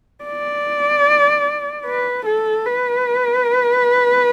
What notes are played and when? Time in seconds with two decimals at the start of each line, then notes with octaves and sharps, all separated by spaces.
0.24 D5
1.86 B4
2.25 A4
2.66 B4